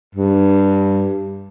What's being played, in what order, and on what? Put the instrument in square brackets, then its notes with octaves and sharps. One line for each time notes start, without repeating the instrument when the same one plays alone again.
[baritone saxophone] G2